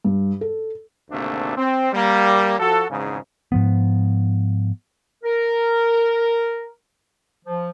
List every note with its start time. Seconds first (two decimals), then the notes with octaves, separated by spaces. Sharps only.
0.05 G2
0.41 A4
1.10 G#1 D2 C3 A3 A#3 D4
1.57 C4
1.93 G3 A#3
2.59 F3 F#4 A4
2.90 G#1 E2 G#2 C#3
3.52 G#2 F3 B3
5.24 A#4
7.46 F3